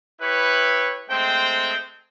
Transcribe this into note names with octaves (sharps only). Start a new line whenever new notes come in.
E4 G4 B4 C#5
G#3 A3 C4 C5 G5